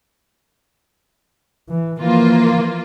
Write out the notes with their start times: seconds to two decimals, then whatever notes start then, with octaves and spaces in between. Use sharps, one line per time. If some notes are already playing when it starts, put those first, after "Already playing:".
1.70 E3
2.00 E3 F3 A#3 F4